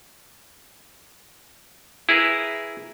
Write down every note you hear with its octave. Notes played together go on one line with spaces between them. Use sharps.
E4 G#4 A#4 B4